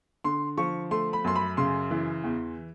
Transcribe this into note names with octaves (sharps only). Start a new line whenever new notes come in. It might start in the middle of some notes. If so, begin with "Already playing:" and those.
D3 C6
F3 C#6
A3 C6
B5
F#2 C6
B5
C#3 C6
E3
E2